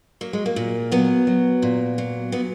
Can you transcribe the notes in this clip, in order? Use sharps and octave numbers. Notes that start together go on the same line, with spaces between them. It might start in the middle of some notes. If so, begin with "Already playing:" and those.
F#3 A#3
G#3
A#3
A#2
F#3 B3
F#3
A#2
F#3
A#2 B3